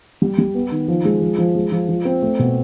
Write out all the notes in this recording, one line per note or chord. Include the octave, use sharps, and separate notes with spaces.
G3
G3
B3
D#3
F3
G#3
F3
F3
G#3
F3
F3
C4
A3
B2